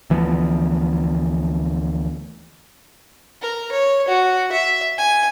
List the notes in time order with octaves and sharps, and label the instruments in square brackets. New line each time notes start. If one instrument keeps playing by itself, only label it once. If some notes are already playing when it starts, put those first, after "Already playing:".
[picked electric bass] D2 E3 F3 B3
[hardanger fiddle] A#4
C#5
F#4
E5
G#5